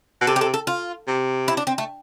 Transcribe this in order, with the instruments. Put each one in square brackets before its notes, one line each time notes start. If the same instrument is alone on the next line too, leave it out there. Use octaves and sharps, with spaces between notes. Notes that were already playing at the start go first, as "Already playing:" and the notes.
[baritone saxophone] B2
[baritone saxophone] C3 [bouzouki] A4
[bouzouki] G4
A4
A4
F4
[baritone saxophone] C3
[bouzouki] E4
D4
C4
A3